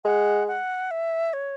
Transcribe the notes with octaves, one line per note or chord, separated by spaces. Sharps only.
G#3 F#5
F#5
E5
C#5